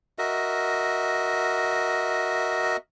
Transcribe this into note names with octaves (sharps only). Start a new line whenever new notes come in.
F#4 A#4 D#5 E5